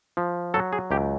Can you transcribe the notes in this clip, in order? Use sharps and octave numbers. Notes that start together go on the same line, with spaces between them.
F3
F#3 A4
G#4
C#2 G4